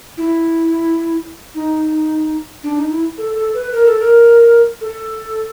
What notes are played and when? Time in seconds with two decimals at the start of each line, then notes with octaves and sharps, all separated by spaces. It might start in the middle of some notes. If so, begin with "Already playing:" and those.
0.17 E4
1.55 D#4
2.64 D4
2.77 D#4
2.91 E4
3.18 A4
3.36 A4
3.54 B4
3.72 A#4
3.86 A4
4.00 A#4
4.81 A4